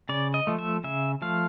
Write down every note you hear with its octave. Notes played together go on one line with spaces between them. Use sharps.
C#3 D5
D#5
F3 A3
E5
C#3 E5
F3 A3 F5